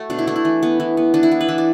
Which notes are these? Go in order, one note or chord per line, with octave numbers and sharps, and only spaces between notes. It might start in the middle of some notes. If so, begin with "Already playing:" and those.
Already playing: A3 F#4
B2 D4
E4
A3 D4
E4
E3
B3
E3
B3
E3 D4
E4
B3
B4
E3 E5
D5